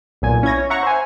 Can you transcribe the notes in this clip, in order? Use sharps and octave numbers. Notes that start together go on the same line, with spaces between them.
B1 A#2 G#5
C#4 E4 G#6 A#6
C#5
E5 F#5 A#5 C#6
C5 E5 G#5